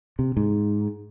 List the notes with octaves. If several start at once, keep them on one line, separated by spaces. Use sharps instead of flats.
C3
G#2